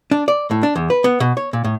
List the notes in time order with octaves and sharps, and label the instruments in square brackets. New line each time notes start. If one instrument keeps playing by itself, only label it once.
[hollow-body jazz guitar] D4
D5
A2
D4
E2
B4
B3
B2
C#5
A#2
A2